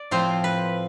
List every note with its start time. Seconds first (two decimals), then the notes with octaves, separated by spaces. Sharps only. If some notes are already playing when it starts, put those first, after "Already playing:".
Already playing: D5
0.11 A2 F3 C4 C5
0.44 B4